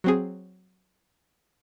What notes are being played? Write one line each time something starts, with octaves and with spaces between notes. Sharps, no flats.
F#3 C4 G#4